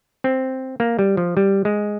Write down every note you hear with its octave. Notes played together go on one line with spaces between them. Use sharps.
C4
A#3
G3
F3
G3
G#3